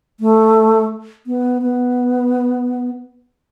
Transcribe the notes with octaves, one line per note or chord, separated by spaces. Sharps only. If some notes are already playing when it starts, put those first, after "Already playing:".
A3
B3
B3